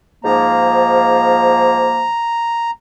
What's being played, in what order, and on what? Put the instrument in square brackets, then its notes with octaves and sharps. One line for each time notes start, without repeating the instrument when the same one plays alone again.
[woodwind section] G#2 F3 A#3 [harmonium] A#5